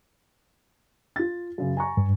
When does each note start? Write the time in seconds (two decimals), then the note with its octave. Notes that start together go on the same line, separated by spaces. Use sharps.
1.16 F4 A6
1.58 F#2 C#3
1.77 G#5 A#5 C#6
1.97 G2